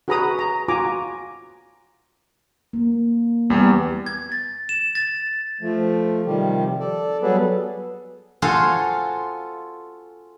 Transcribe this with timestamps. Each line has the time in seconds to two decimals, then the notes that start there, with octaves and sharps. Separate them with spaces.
0.08 F#4 G#4 B4 A#5 B5 D#6
0.39 A#5
0.68 F4 F#4 G#5 A#5 D6
2.73 A#3
3.50 E2 G3 B3
4.06 G#6
4.32 A6
4.69 E7
4.95 A6
5.61 F3 A3
6.26 C3 D#3 F3 G3 G4
6.80 A4 D5
7.22 F#3 G3 B3 G#4 A4 B4
8.42 F4 F#4 G#4 A4 C5 F5